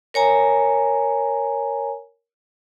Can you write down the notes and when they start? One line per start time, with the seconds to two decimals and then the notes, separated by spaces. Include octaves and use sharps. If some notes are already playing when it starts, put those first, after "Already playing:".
0.14 A#4 C#5 G#5 A#5